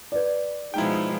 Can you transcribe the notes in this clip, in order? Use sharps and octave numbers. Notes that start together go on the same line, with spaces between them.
B4 D5
B2 F3 G#3 D#4 E4 G5